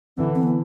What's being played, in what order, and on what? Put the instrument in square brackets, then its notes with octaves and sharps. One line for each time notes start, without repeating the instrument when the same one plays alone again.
[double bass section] D3 E3 [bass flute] C4
[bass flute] C4
B3